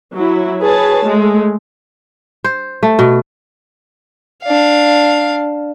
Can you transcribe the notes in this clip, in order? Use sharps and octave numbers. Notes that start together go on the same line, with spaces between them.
F#3 E4
G#4 B4 C#5 A5
G#3 A3
C5
A3
B2
D4 F5